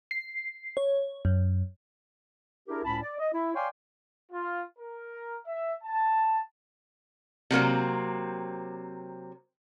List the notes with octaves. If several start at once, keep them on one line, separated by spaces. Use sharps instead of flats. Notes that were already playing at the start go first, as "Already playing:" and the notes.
C7
C#5
F#2
D4 E4 G4 G#4 A#4
C#2 A2 C#4 A5 B5
D5
D#5
E4
C#5 D5 F5 G5 G#5 C6
F4
A#4
E5
A5
C3 F#3 A#3 C4